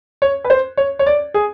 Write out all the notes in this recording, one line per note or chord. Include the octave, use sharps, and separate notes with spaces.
C#5
B4
C5
C#5
C#5
D5
G#4